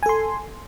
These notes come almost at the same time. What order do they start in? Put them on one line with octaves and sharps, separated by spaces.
G#5 A4 C6